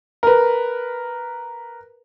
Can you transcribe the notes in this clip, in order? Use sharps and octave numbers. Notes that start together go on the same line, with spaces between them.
A#4 B4